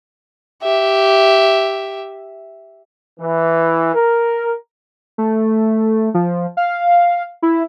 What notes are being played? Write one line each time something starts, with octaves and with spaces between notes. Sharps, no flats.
G4 E5
E3
A#4
A3
F3
F5
E4